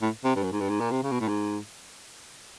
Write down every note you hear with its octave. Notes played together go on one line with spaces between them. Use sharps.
A2
C3
G2
F#2
G#2
G2
G#2
A#2
C3
C#3
B2
A2
G#2